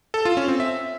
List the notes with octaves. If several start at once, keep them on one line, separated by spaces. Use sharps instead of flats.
A4
F4
C#4
C4
E5